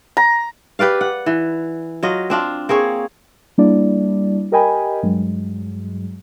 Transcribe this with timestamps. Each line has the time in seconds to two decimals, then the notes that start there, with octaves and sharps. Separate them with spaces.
0.17 A#5
0.79 G4 B4 D5 F5
1.01 F#5
1.26 E3
2.03 F#3 F4 D#5
2.30 C4 D4 F4
2.69 A#3 C4 G#4 C#5
3.58 G3 A#3 D4 E4 D5
4.52 G4 A#4 D#5 G5 G#5 B5
5.03 G2 F#3 G#3